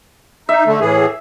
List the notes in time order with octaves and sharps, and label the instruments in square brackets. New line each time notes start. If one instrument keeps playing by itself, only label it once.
[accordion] D#4 [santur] E5
[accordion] D3 A3
A2 E3 G#4